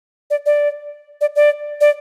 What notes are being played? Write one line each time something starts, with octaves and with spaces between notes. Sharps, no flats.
D5
D5
D5
D5
D5